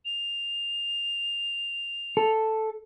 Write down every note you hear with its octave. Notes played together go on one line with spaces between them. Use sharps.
F7
A4